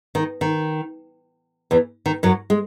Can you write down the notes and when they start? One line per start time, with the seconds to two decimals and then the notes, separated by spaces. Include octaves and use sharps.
0.15 D#3
0.41 D#3
1.71 E2 E3
2.06 D#3
2.23 F#2 F#3
2.50 G#3